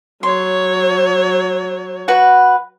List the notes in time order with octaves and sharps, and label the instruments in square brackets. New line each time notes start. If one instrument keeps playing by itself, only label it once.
[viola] F#3 C#5 [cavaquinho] C6
[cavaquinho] F#4 B4 F#5